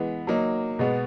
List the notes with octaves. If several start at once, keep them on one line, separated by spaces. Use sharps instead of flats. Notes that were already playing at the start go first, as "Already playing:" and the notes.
Already playing: E3 G#3 B3
F#3 A#3 D#4
B2 G#3 B3